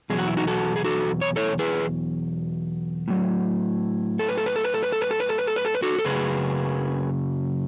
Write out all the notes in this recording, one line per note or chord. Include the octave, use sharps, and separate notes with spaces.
E2 B2 F#3 G#4
F#4
E4
D#4 F#4
F#4 A4
G#4
F#4 A4
C#5
A4 C#5
G#4 B4
A2 F#3
A4
B4
A4
B4
A4
B4
A4
B4
A4
B4
A4
B4
A4
B4
A4
B4
A4
B4
F#4 A4
A4
F#2 C#3 F#3 G#4 B4